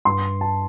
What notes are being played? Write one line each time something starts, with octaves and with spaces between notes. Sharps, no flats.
G2 C6
A5